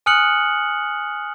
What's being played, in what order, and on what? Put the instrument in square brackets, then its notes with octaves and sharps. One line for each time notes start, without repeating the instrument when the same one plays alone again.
[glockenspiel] G#5 D#6 F6 F#6 C#7 F#7